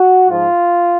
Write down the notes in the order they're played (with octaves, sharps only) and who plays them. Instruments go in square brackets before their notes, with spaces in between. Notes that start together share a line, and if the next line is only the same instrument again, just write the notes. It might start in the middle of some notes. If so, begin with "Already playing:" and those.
Already playing: [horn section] F#4
G#2 F3 F4